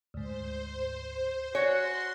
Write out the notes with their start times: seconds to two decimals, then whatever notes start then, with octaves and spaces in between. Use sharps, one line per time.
0.14 D2 G#2 C5
1.55 F#4 C#5 G#5 C6